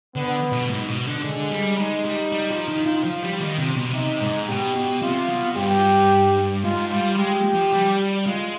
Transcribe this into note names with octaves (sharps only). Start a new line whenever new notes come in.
D3 B3
B2
G#2
B2
D3
D3 G#3
G3
G#3 D#4
G3
G3
F3
D#3
D#3 F4
F3
G3
D#3
C3
B2
C3 D#4
G#2
B2 G4
B2
C3 F4
B2
G2 G4
G#2 F4
G3
G#3 G4
F3
G3
G#3 F4